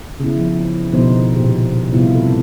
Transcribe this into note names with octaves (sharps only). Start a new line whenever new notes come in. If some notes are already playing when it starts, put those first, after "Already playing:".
C#3 B3 E4
F3
B2 D3 F3 B3 D#4 C5
A#2 G4
C3 G3 B3 E4 F4
A4